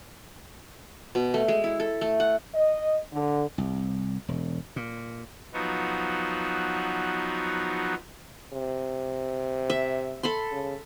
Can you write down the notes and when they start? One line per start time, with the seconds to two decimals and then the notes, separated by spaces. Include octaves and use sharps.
1.15 B2
1.34 A3
1.48 G#3
1.64 E4
1.80 A4
2.01 A3
2.20 F#5
2.55 D#5
3.13 D3
3.58 C2
4.28 E1
4.76 A#2
5.53 F3 F#3 B3 D#4 F#4
8.53 C3
9.70 E5
10.23 A4 B5 C6
10.52 C#3